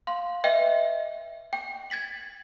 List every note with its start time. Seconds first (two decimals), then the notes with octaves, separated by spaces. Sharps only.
0.07 F5 C6
0.44 B4 D#5 E5 G5
1.53 G5
1.90 G#6 A6 B6 F#7